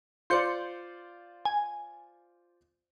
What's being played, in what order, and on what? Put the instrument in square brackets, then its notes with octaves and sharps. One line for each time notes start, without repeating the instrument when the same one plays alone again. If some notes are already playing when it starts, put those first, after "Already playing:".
[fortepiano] F4 C5 D5 [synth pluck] C6 G6 C#7
[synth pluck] G#5